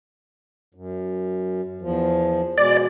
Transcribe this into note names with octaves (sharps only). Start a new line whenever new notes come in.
F#2
E2 F3
B2 G#3 D5